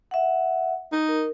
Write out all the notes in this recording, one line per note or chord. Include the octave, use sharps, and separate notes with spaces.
E5 F#5
D#4
A#4